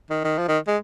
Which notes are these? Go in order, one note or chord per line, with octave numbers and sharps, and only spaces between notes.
D#3
D#3
F3
D#3
G#3